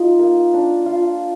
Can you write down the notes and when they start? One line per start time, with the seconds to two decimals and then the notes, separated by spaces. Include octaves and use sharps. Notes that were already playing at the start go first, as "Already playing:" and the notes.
Already playing: D#4 F4
0.19 A#3
0.54 D4
0.86 F4